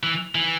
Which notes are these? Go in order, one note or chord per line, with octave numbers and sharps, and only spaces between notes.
E3
E3